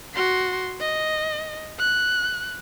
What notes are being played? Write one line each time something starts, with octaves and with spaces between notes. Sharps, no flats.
F#4 C6
D#5
F#6